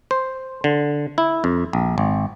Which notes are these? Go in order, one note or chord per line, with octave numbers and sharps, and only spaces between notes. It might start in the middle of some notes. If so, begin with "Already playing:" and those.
C5
D3
E4
F2
A#1
G#1